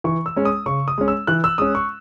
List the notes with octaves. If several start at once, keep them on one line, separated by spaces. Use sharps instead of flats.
E3 C#6
E6
G#3 C#4
D#6
C#3 C#6
D#6
G#3 C#4
E6
E3 F#6
E6
G#3 C#4 D#6
C#6